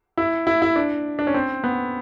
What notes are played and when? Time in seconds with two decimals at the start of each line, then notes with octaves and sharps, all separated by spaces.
0.17 E4
0.47 E4
0.62 E4
0.76 D4
1.19 D4
1.27 C#4
1.34 C4
1.64 B3